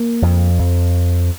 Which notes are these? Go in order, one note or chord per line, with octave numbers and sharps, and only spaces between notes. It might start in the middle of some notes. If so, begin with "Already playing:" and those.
Already playing: A#3
F2
F2